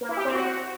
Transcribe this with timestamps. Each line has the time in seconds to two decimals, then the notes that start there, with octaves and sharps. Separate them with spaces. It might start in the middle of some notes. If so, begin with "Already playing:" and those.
0.01 A#3
0.09 E4
0.17 G4
0.25 C4
0.33 F#4